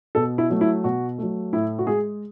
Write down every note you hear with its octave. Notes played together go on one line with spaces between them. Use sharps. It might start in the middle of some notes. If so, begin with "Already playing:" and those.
B2 A4
E4
F#3 A3
E4
B2 F#4
F#3 A3
A2 E4
F#4
G#3 G#4